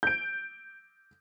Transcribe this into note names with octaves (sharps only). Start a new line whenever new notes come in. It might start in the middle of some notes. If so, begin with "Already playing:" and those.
G6 D7